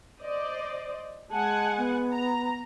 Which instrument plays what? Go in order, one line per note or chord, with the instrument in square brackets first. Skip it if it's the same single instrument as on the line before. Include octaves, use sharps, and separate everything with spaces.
[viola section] C5 D5 D#5
[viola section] G#3 F#5 G#5 [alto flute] A5
[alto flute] B3
[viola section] A#5